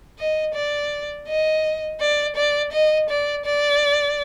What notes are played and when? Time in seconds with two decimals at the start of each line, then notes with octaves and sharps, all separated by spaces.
0.19 D#5
0.54 D5
1.28 D#5
2.00 D5
2.36 D5
2.72 D#5
3.09 D5
3.45 D5